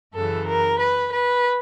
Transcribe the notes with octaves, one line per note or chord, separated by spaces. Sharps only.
F#2 C#3 E3 A4
A#4
B4
B4